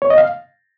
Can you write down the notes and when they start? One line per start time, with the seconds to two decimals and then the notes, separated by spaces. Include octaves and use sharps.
0.02 C#5
0.10 D#5
0.18 F5